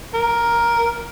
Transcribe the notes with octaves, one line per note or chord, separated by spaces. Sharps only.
A#4